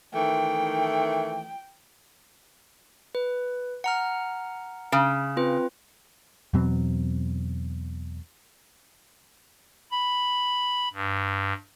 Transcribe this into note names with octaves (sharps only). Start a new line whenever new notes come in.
D#3 E3 A3 G5
B4
F#5 A#5 F6
C#3
C4 F4 B4
E2 B2 F#3 C4
B5
G2